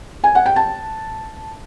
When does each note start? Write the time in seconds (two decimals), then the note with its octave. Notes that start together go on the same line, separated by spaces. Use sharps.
0.24 G#5
0.35 F#5
0.46 G5
0.56 A5